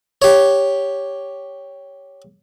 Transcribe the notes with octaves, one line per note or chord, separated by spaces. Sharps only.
G4 C#5